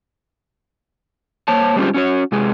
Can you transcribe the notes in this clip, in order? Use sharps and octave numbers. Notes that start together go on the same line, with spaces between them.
A#3 C5 C#5 A5
G3 G#3 C4 C#4 F4 G4
C#4 F#4 C#5
C3 G#3 G#4